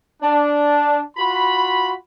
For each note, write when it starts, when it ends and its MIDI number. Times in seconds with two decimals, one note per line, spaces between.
0.22 1.00 62
1.17 1.92 65
1.17 1.92 66
1.17 1.92 83